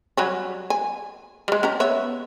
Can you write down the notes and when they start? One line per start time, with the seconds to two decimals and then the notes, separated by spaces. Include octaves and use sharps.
0.17 F#3 G3 C#4
0.70 G#5
1.48 G3 G#3
1.63 C#4 G4 A#5
1.80 B3 C#5 E5